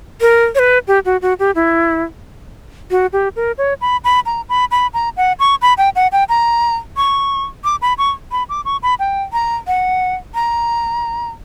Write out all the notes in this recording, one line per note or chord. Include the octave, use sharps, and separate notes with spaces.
A#4
C#5
B4
G4
F#4
F#4
G4
E4
F#4
G4
A#4
C#5
B5
B5
A#5
B5
B5
A#5
F#5
C#6
B5
G5
F#5
G5
A#5
C#6
D6
B5
C#6
B5
D6
C#6
B5
G5
A#5
F#5
A#5